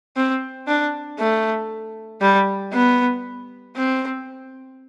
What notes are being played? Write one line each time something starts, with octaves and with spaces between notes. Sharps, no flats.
C4
D4
A3
G3
B3
C4